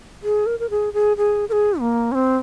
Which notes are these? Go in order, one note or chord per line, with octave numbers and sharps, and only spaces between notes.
G#4
A#4
A#4
G#4
G#4
G#4
A#4
G#4
A#3
C#4
C4